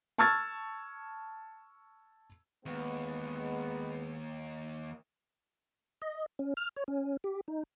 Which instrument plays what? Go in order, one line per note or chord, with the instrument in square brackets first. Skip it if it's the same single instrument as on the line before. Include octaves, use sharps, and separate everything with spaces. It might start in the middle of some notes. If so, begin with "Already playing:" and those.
[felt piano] A5 C#6 E6 F6 G#6 A6
[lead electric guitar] D#2 [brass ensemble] G#3 B3
[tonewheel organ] D#5
C#4
F6
C#5
C#4
G4
D#4